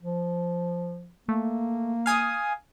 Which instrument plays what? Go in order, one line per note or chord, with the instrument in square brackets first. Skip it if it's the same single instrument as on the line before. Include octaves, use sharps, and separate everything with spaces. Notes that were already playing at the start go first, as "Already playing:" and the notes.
[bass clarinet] F3
[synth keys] A3 [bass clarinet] A#3
[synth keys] F5 G#5 D#6